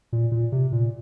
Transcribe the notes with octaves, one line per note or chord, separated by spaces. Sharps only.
A#2
A#2
C3
A#2